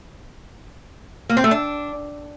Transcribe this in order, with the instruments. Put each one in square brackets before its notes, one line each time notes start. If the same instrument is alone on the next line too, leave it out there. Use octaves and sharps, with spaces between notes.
[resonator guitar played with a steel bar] A#3
C4
A3
D4